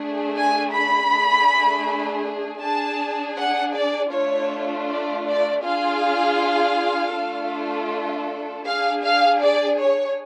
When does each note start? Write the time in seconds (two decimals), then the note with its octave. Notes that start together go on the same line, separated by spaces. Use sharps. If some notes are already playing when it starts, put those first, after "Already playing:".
Already playing: A3 D4 G#4
0.34 G#5
0.72 B5
1.10 A3 D4 G#4
2.62 D4 G#4 A5
3.37 F#5
3.75 D5
4.12 A3 D4 F4 C#5
4.88 D5
5.26 D5
5.64 D4 F4 G#4 F5
7.15 A3 D4 F4 A4
8.66 D4 G#4 F5
9.04 F5
9.42 D5
9.79 C#5